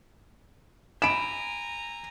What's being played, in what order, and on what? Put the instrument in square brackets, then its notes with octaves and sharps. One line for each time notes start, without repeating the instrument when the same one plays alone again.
[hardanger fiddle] G#5 A#5 [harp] B5 [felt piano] D7 E7